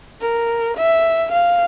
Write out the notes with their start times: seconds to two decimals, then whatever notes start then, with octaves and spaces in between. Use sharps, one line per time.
0.21 A#4
0.77 E5
1.32 F5